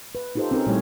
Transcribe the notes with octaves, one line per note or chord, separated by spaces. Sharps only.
B4
D#4 F4 G4 A4 C5
C4 C#4 D#4 G#4 A#4
A#2 G3 A3 E4 G4 C#5